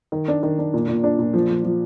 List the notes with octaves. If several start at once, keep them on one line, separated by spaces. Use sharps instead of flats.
D#3
D4
D#3
D4
A#2
A#2
D4
A#2
F3
F3
F3